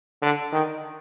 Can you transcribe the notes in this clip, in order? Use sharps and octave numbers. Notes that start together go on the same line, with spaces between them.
D3
D#3